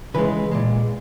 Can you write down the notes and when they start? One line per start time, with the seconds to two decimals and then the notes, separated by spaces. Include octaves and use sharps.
0.14 C#3 E3 G#3 B4
0.52 A#2 G#3